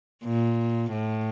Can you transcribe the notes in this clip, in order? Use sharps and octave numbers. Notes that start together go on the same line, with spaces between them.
A#2
A2